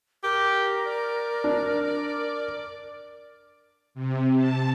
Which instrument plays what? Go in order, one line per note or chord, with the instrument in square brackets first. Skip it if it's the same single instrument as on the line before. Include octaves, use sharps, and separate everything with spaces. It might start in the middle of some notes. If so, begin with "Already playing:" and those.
[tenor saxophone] G4 [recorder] A#4
[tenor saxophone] D5
[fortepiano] D4
[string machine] C3
A5